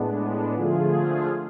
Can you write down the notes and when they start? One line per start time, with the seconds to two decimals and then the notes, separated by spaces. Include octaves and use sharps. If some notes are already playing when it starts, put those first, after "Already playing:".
Already playing: A2 G#3 B3 D4
0.54 D3 F3 A3 F4 G#4